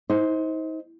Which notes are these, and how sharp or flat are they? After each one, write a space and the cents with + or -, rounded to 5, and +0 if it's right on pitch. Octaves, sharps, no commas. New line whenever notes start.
D#4 +40 C5 +0